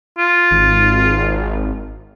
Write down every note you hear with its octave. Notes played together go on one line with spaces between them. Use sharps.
F4
G#1